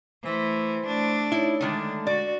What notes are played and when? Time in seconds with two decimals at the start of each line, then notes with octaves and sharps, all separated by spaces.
0.24 E3 A3 C5 B5 C6
0.86 A3 D4
1.32 D#4 E4 C#5
1.61 D3 D#3 G#3 A3 D4
2.07 F#4 D5